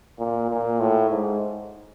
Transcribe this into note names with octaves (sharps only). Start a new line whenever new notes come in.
A#2
A#2
A2
G#2